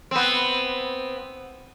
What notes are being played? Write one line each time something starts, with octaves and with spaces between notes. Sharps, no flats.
B3 C4